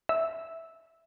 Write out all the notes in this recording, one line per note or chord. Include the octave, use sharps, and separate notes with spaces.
E5